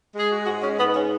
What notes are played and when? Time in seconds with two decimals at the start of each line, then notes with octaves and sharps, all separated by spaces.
0.15 G#3 G#4
0.31 F#4
0.42 G#4
0.46 G#2 F#4
0.62 C#4
0.79 G#2 B3
0.95 C#4